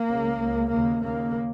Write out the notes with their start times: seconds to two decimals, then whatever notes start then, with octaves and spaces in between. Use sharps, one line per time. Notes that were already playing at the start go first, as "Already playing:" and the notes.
Already playing: A#3
0.09 C#2 C#3
0.40 C#2 C#3
0.71 D#2 C#3 A#3
1.03 D#2 C#3 A#3